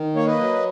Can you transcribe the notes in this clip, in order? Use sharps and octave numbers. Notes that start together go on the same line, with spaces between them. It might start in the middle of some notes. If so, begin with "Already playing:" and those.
Already playing: D#3
A#3 C#5
B4 D#5
F#3